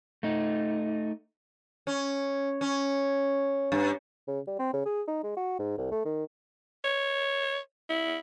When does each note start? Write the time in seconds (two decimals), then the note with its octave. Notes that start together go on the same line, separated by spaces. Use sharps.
0.23 A3 D#4
1.87 C#4
2.61 C#4
3.72 G2
4.28 C#3
4.47 G3
4.59 C4
4.73 C#3
4.86 G#4
5.08 D#4
5.23 G#3
5.37 F#4
5.59 G#2
5.78 C2
5.91 A3
6.05 D#3
6.84 C#5
7.89 E4